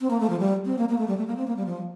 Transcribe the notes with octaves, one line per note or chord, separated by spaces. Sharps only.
C4
A#3
A3
F3
G3
C4
A#3
A#3
A3
G3
A3
A#3
C4
A#3
G3
F3